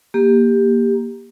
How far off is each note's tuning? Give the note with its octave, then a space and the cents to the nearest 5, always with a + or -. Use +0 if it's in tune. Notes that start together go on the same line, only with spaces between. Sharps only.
A#3 +5 G4 +15